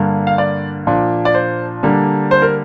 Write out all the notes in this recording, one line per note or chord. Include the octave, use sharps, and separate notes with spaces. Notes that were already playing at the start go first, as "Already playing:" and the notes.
Already playing: G2 D3 A#3
F5
D5
A#2 F3 D4
D5
C5
D3 G3 A#3 D4
C5
A#4